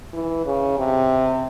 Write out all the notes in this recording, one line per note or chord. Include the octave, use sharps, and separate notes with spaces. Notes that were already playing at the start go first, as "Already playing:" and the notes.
E3
C#3
C3